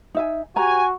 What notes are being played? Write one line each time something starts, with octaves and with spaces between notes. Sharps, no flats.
D#4 E5 G#5
F#4 G4 C5 G#5 A#5